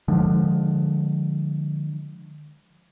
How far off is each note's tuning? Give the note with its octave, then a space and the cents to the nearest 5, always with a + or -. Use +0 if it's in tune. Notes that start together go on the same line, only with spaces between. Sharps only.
D3 +30 F3 +15 G#3 +0